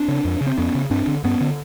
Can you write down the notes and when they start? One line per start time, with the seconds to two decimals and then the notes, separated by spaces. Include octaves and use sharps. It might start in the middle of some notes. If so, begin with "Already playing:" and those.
Already playing: C4 D4
0.08 C#3
0.25 F2
0.41 C#3
0.47 C4
0.58 F2 B3 C#4
0.75 C#3
0.91 G2 C4 D4
1.07 D3
1.24 G2 B3 C#4
1.41 D3